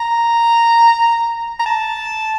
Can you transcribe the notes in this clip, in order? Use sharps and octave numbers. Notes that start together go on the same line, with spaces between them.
A#5
A#5
A5